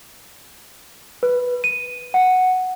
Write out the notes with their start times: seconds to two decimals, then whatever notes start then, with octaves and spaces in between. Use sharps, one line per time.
1.23 B4
1.64 D#7
2.14 F#5